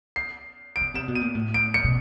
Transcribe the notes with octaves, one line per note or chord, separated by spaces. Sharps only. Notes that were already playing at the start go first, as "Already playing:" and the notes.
C7
D7
C#3
C3 E7
B2
D#7
A#2
A2
D7
C#7
B2